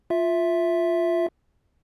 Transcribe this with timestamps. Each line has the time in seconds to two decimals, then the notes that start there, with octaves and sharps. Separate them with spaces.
0.10 F4 E5